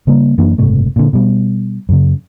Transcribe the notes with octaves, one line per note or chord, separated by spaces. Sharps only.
C#3 G3 A#3
F#2 E3 A#3 D4
F#1 G#2 C3 A3
A#2 D3
B2 G3
F#2 C#3